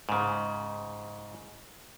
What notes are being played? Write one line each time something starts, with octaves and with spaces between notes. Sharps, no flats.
G#2 C#3